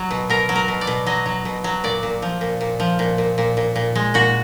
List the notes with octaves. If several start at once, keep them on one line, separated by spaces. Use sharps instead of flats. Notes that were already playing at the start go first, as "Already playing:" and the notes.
Already playing: F#3
B2
B2 A#4
F#3
A#4
B2
D5
B2
F#3 D#5
F#3
B2
F#3
A#2 D5
A#2
F3
A#2
A#2
F3
A#2
A#2
A#2
A#2
A#2
G#3
A#2 F#4